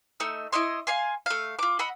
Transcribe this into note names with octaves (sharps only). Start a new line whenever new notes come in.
A3 D#4 E6
E4 C#5 D#5 C6
F5 G#5 C6
A3 F5
F4 D6
D#5 F#5 B5 E6